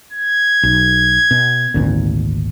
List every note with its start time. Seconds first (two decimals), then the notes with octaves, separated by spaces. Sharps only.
0.13 G#6
0.63 B1
1.31 B2
1.74 G#1 D2 A#2